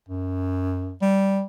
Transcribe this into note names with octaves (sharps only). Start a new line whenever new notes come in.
F#2
G3